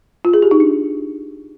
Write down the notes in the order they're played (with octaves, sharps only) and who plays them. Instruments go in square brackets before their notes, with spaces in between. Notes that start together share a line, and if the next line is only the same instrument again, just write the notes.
[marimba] F4
G#4
G4
D#4
D4